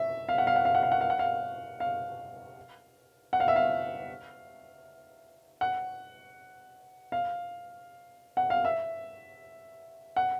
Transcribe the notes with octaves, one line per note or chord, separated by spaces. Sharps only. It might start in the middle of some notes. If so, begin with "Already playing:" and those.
Already playing: E5
F5
F#5
F5
F#5
F5
F#5
F5
F#5
F5
F#5
F5
F5
F#5
F5
E5
F5
F#5
F5
F#5
F5
E5
F#5